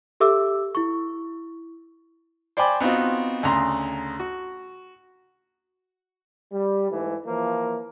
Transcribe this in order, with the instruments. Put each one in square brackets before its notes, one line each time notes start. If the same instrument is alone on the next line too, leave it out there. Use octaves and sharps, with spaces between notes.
[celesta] G4 A4 E5 D6 E6
E4 C#6
[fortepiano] C5 D5 G5 G#5 B5 D6
B3 C4 D#4 F4 F#4
D2 C#3 A#5 C6
F#4
[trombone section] G3
G#2 E3 A3
E3 F3 A#3